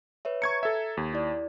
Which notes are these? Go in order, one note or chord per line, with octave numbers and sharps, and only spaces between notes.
B4 C#5 E5
A#5 C#6 G#6 C#7
A4 E5
D#2
E4 D5